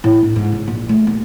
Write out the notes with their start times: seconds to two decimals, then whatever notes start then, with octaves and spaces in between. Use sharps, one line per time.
0.04 A2
0.23 D4
0.36 G#2
0.52 C#3
0.68 A#1
0.89 A3
1.07 D#2